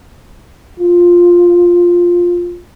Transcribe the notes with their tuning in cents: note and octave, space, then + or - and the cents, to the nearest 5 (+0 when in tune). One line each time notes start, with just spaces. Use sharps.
F4 +5